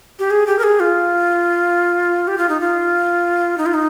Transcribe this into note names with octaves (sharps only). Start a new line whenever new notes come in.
G4
G#4
G4
A#4
G#4
F4
G4
F4
D#4
F4
D#4
F4
D#4